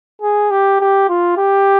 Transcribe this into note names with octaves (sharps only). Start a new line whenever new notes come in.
G#4
G4
G4
F4
G4